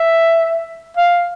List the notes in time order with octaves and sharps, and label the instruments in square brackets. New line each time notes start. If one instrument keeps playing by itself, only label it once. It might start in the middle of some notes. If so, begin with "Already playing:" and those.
Already playing: [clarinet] E5
F5